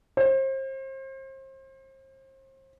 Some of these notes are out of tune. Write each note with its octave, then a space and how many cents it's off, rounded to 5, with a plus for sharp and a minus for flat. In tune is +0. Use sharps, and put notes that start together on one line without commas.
C5 +35